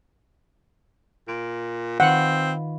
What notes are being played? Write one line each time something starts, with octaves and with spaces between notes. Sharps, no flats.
A#2 D7
D#3 C4 F4 B4 F#5